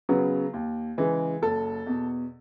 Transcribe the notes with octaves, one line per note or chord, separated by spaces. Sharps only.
C#3 F#3 B3
D#2
C#3 E3 G#3
F#1 A4
E2 B2